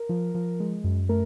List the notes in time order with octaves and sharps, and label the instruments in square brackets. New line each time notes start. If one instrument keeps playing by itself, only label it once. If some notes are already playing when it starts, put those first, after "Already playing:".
Already playing: [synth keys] A#4
F3
F3
G#3
F#2
A3 A#4